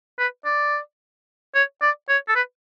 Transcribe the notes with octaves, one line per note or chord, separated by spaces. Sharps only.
B4
D5
C#5
D5
C#5
A4
B4